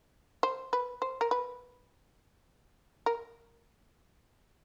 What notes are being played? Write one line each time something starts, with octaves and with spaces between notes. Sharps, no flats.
C5
B4
C5
A#4
B4
A#4